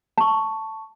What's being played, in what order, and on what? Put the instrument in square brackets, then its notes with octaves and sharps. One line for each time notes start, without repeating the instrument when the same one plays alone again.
[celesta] A5 C#6